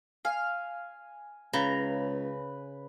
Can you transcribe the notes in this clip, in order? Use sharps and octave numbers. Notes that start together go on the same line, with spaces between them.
F5 G#5
C#2 C#3 B4 A#5